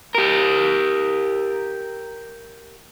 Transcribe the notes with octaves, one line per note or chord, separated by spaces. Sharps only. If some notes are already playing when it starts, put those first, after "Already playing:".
G4 A#4